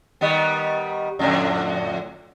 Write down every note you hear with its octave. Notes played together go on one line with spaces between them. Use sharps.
D#3 G3 B3
F2 A2 D3